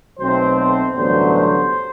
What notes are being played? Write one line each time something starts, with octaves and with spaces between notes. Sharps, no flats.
B1 B2 F#3 A3 C4 C5
C5
A1 G2 D3 F#3 B3 C5
C5